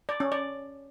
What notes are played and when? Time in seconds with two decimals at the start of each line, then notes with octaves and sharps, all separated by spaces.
0.09 D5
0.20 C#4
0.32 D5